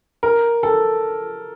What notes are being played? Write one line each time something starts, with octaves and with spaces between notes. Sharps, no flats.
A#4
A4